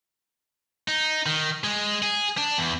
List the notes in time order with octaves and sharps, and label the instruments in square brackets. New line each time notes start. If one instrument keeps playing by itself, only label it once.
[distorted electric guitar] D#4
D#3
G#3
G#4
D4
E2